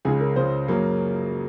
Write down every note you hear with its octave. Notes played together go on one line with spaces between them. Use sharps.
C#2 C#3 G#3 G#4
A#4
C#2 C#3 G#3 C5
F#2 C#3 F#3 A#3